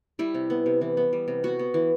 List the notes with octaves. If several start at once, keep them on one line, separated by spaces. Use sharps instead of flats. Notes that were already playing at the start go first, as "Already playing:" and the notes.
G3 E4
C3
B3
C3
E3
B3
G3
C3
B3 F#4
B3
E3